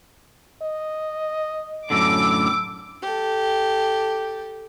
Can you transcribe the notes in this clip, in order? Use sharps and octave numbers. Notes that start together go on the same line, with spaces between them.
D#5
F#2 A2 D3 D6 E6
G4 A4